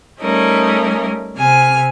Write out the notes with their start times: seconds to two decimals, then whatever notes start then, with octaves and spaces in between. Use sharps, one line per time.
0.21 G3 A3 C#4 D#4 A#4
1.37 C3 G#5 F6